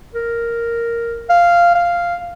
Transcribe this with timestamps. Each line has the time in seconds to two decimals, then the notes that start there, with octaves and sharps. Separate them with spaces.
0.15 A#4
1.30 F5
1.75 F5